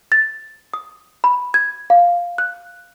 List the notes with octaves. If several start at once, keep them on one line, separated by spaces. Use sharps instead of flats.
A6
D#6
B5
G#6
F5
F#6